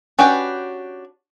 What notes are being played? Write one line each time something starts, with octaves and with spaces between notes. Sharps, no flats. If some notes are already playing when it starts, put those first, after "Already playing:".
C#4 D4 F#4 G4 B4